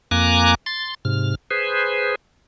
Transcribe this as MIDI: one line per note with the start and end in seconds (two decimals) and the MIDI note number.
0.11 0.55 41
0.11 0.55 58
0.11 0.55 80
0.11 0.55 82
0.11 0.55 86
0.11 0.55 90
0.66 0.94 84
0.66 0.94 93
1.05 1.35 44
1.05 1.35 48
1.05 1.35 89
1.51 2.15 68
1.51 2.15 71
1.51 2.15 72